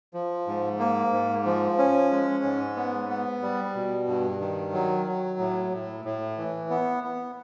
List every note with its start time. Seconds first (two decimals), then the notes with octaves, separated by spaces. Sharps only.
0.14 F3
0.47 G#2
0.79 A#3
1.12 G#2
1.46 F3
1.78 C#4
2.11 G#3
2.44 G#2
2.76 B3
3.09 B3
3.42 G3
3.75 B2
4.08 G2
4.40 D#3
4.73 F#3
5.06 F#3
5.39 A2
5.72 A2
6.05 A2
6.38 E3
6.70 B3
7.04 B3